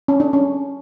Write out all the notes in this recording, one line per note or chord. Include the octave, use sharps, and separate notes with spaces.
C#4
D4
C#4